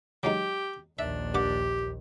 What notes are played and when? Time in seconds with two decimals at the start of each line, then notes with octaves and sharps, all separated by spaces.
0.23 F#3 G#3 D#4 G4
0.99 A#1 D#2 D4 E5
1.34 G2 G4 F#5 D6